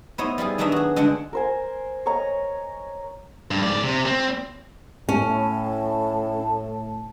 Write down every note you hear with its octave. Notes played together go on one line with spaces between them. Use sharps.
B3 D#4 E4 C5 C#5 D#5
G3 E4 F4 G#4
D#3 F#3 B3 D4 D#4 E5
F#4 G#4
D3 G#3 D4 D5 F#5
A#4 C5 G#5
C#5 D#5 A#5
G2
G#2 D5
C3
C4
A2 C#4 A5